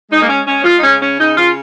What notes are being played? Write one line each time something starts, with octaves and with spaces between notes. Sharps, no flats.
G#3 D#4
A#3
C#4
G#3 C#4
F4
D#4
C#3 C#4
C#4
C#3 D#4
F4